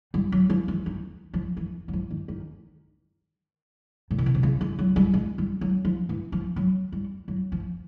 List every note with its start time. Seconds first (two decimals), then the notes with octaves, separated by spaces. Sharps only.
0.14 G3
0.32 F#3
0.50 F3
0.68 E3
0.86 D#3
1.34 F3
1.57 E3
1.88 F#3
1.93 F3
2.10 D#3
2.28 D#3
4.11 A2
4.18 A#2
4.26 B2
4.34 C3
4.43 C#3
4.61 C#3
4.79 F#3
4.96 G3
5.14 G#3
5.38 G3
5.61 F#3
5.85 F3
6.09 E3
6.32 F3
6.56 F#3
6.92 G3
7.28 F#3
7.52 F3